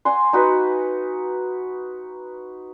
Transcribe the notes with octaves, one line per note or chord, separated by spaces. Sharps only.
F#5 G#5 C6
D#4 F#4 B4